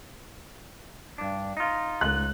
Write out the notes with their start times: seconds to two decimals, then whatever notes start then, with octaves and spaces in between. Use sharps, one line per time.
1.18 G2 D4
1.57 D#4 F4
2.01 C#2 F#6